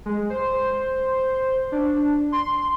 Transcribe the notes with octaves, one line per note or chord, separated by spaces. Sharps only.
G#3
C5
D4
C6